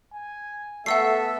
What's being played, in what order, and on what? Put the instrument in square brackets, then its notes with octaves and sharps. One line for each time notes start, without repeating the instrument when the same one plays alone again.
[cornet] G#5
[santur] A3 [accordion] B3 A4 [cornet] E5 [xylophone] F#5 E6 C7